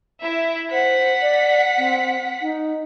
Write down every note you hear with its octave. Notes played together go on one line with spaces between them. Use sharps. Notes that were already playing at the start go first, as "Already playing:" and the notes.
E4 E5
C5 F#5 B6
D5
C4
D#4